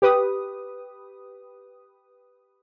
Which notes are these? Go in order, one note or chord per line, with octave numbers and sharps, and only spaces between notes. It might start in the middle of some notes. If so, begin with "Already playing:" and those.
G4 B4 D#6